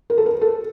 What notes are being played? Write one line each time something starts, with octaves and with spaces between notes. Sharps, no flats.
A#4
A4
A#4
A4